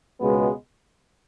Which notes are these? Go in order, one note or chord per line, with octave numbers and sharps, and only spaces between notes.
C#2 B2 G#3 B3